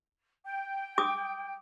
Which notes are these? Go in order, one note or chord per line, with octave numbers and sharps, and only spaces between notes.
G5
D6 D#6